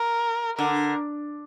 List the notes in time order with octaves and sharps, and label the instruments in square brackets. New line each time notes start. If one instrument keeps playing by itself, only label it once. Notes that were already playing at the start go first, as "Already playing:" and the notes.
Already playing: [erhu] A#4
[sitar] D3 [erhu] A#4